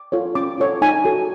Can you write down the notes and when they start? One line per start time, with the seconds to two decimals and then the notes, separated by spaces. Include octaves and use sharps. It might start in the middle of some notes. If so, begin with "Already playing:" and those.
Already playing: D6
0.12 F4 A4 C#5
0.35 C#4 D6
0.58 F4 A4 C#5
0.82 D#4 G#5
1.05 F#4 A4